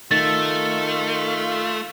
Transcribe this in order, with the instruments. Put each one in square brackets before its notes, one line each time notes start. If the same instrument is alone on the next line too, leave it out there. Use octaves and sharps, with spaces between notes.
[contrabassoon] D#3 [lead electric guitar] A3 [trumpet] F4 [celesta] A6